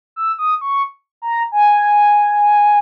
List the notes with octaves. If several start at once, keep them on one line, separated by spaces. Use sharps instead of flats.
E6
D#6
C#6
A#5
G#5